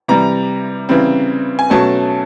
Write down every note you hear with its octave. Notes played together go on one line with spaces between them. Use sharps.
C3 E3 G3 A#5
C#3 E3 G3 C4
G#5
B2 F#3 A3 C#4 A5